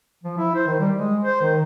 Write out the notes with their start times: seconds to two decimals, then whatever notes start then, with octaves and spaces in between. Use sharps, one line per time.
0.24 F3
0.38 E4
0.55 C5
0.67 D#3
0.80 G3
0.97 G#3
1.25 C5
1.42 D#3